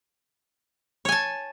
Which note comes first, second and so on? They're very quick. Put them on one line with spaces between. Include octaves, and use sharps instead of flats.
C#5 G#5 A5